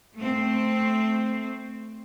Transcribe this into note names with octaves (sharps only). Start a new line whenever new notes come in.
A3 C4